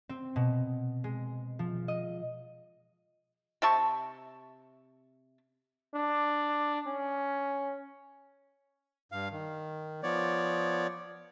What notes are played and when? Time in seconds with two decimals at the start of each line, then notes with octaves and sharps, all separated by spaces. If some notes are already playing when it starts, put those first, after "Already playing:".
0.09 C4
0.36 B2
1.04 G#3
1.59 F3
1.88 D#5
3.62 C3 E5 A5 C#6
5.94 D4
6.87 C#4
9.12 G2 F5
9.32 D#3
10.03 F3 B3 C#5 D5